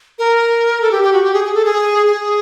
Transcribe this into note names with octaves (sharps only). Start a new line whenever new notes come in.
A#4
A4
G4
G4
F#4
G4
G#4
G#4
A4
G#4
G#4